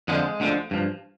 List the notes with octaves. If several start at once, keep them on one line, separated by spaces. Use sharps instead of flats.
F2 D3 F3 G#3
D2 D3 F3
G2 F3